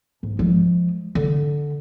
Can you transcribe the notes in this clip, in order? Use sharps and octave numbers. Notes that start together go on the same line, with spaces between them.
G#2
F3 G#3
D3